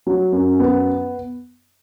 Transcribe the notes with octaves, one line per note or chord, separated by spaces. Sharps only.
F#3
F#2
B3